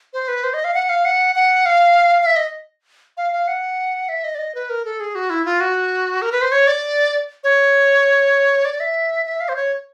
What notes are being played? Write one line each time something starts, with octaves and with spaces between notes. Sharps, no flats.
C5
B4
C5
D#5
F5
F#5
F5
F#5
F#5
F5
F5
E5
D#5
F5
F5
F#5
E5
D#5
D5
D#5
B4
A#4
A4
G#4
F#4
E4
F4
F#4
A#4
B4
C5
C#5
D5
C#5
D5
E5
E5
F5
C5
C#5